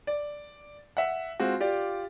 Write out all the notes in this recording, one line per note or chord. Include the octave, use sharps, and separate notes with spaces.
D5
E5 F#5
G#3 C4 F4 F#4
F4 G4 D5